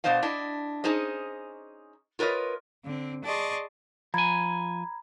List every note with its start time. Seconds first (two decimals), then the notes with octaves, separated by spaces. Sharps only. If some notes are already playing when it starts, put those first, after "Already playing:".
0.04 B2 B3 D4 C5 D#5 F5
0.23 D4 E4 D#5
0.84 C#4 D#4 G#4 C5 D#5
2.19 F4 A#4 B4 C#5 D#5
2.85 D3 C4
3.24 G#4 D5 D#5 A5 C6 C#6
4.14 F3 G#5 A#5 B5 G#6